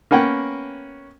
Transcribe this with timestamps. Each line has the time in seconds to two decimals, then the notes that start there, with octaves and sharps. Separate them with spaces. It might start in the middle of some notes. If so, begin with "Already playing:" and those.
0.11 A#3 B3 C#4 F#5 G5